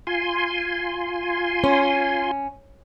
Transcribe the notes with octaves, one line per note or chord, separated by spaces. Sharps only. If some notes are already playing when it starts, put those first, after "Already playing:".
F4 G#5 C6
C#4